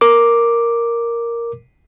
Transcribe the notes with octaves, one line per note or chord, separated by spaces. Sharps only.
A#4 D6